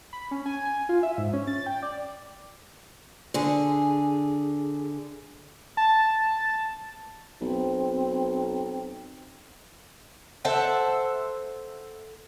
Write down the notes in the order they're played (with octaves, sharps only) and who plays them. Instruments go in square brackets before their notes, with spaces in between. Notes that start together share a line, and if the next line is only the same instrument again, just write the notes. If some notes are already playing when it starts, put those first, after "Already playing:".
[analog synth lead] B5
C#4
G#5
G#5
F4
E5
G#2
C#4
A6
G5
D5
[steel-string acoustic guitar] D3 G#4
[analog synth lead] A5
[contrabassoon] B1 [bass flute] C4
[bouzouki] A4 C5 E5 F#5